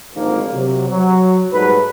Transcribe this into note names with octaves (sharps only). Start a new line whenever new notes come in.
G#1 D2 G#2 D#3 F3 A#3
C3 F#3
F#3
G#2 F#3 G3 A3 B4